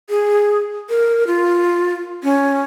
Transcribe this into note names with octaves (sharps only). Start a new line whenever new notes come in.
G#4
A#4
F4
C#4